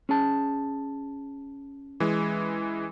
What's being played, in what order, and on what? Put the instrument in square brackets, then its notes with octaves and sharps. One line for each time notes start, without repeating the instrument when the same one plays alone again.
[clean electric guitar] C#4 G#4 A5
[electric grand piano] E3 G#3